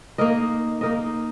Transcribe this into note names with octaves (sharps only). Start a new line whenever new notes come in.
A#3 D#4 A#4 D#5
A#3 D#4 A#4 D#5